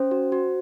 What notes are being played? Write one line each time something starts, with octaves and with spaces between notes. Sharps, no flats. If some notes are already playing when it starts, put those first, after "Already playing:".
Already playing: C#4 C5
F#4
F#4